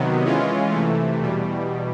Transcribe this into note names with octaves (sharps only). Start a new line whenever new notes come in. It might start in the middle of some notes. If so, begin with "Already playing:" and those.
Already playing: C3 D#3 F#3 B3
E3 G#3 C#4 F4
C3 E3 A3
E2 B2 G3